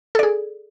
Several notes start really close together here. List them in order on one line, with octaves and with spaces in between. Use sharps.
A4 D5 G#4